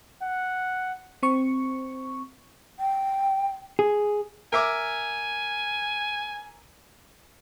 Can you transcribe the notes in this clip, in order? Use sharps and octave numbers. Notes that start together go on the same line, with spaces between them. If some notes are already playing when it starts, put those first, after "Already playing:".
F#5
C4 C#6
G5
G#4
A#4 E5 G#5 D6